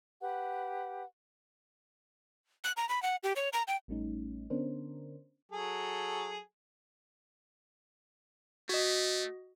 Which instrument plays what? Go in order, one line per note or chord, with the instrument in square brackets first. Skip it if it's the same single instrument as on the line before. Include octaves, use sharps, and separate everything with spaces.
[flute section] G4 B4 F#5
[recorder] F#6
A#5
B5
F#5
G4
C#5
A#5
G5
[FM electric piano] A1 G3 A3 C#4 D#4
D3 B3 C#4 D4 A#4 C5
[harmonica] F#3 G#4 A4
[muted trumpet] A3 [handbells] F#4 D#5